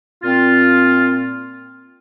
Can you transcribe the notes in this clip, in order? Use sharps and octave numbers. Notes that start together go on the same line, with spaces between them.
A#2 C4 F4